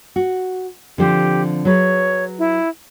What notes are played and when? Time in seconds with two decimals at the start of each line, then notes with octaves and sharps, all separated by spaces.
0.16 F#4
0.98 D3 F3 C4 G4
1.65 F#3 G#4 B4 C#5
2.39 E4